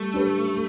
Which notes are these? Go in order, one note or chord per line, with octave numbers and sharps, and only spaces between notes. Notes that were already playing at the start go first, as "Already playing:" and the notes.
Already playing: G3 A3
D4 G4 B4